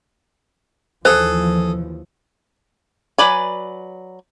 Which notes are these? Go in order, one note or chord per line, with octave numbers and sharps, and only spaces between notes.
D#2 E3 F3 G#4 A4 C5
F#3 B4 D5 G#5